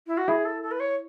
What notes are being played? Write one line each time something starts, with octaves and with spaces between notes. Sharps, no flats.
E4
F#4
E4 G#4
A4
A4
B4
C#5